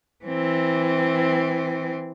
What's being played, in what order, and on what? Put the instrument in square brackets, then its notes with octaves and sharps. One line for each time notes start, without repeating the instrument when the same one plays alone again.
[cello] E3 C4